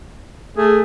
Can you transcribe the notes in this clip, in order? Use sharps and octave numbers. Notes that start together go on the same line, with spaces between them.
A3 G#4